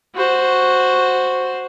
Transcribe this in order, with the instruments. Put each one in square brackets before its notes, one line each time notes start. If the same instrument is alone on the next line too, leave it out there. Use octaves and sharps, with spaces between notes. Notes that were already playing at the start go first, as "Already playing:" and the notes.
[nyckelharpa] F#4 C5